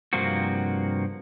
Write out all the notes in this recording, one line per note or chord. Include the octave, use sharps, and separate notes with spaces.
G2 C3 F3 A#3 C4 F#4